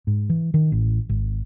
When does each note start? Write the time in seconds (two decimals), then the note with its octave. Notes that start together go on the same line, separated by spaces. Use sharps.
0.07 G#2
0.29 E3
0.54 D#3
0.72 A1
1.09 G#1